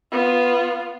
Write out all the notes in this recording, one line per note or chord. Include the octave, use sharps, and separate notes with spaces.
B3 F4